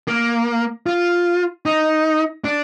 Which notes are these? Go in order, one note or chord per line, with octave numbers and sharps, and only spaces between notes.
A#3
F4
D#4
D4